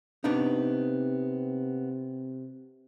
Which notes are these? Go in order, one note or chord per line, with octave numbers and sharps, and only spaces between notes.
C3 B3 D4 D#4